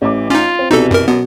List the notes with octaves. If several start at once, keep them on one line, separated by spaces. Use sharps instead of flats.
A1 E3 D6
C#4 D#4 F4
C4
C2 B2 E3 D#4 A4
F#2 A#4
F#2 B2 B3